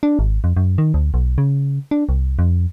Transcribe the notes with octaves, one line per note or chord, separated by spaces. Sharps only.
D4
G#1
F2
F#2
D#3
D2
B1
C#3
D4
C2
F2